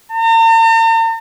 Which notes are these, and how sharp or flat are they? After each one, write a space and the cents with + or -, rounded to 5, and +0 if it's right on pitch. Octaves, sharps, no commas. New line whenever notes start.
A#5 -45